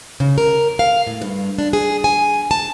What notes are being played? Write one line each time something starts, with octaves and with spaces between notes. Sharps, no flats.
C#3
A#4
F5
A2
G2
D4
G#4
G#5
A5